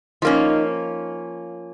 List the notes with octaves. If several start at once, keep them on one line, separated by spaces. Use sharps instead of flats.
F3 A#3 C#4 D#4